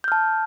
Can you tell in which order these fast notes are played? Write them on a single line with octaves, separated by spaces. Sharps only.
G6 F6 A5